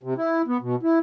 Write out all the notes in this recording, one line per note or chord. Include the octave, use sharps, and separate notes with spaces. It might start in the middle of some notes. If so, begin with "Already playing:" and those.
C3
E4
B3
B2
E4